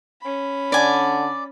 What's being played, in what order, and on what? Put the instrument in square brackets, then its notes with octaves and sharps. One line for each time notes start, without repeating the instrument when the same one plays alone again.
[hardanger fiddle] C#4 B5
[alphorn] D3 [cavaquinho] D5 G#5